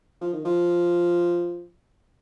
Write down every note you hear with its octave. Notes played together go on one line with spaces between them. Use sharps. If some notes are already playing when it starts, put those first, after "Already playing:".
F3
D#3
F3